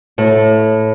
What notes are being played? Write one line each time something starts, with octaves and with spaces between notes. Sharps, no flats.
A2